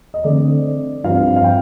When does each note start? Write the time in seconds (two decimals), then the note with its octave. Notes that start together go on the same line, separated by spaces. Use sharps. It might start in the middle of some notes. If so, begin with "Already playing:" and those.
0.14 D#5
0.24 D3 A3 C4 D5
1.03 G2 F3 C4 F5
1.36 F5
1.44 G5